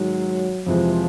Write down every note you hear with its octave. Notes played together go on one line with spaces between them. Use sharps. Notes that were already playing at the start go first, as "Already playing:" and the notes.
Already playing: G#2 D#3 F#3 G#3
F2 C3 E3 F3 G#3